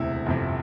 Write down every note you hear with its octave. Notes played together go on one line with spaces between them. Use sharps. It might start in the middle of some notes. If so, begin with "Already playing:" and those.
Already playing: E1 D2 C3 E4
G1 F2 C3